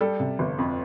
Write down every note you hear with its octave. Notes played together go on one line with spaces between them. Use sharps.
G3 A4
C3
G1
F2